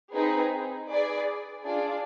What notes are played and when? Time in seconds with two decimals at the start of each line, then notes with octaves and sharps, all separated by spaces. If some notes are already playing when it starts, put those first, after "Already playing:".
0.14 C4 D#4 G#4 B4
0.89 G#4 B4 D5
1.65 D4 F4 G#4 D5